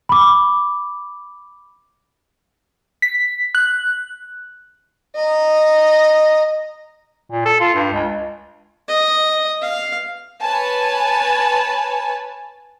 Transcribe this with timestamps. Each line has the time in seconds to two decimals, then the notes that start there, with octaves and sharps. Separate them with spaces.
0.09 B5 D6
3.02 B6
3.55 F#6
5.16 D#5 A#5
7.31 A#2
7.46 A4
7.60 F4
7.75 G2
7.94 C#2
8.88 D#5
9.62 F5
10.42 B4 C#5 G#5 A5